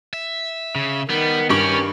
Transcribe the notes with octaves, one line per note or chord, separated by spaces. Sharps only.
E5
C#3
D#3 G3 B3
G2 C#4 G4 D5 C#6 F#7